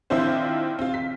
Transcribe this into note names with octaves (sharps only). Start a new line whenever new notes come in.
D#3 C4 D4 E4 F4 C5
C4 F4
B6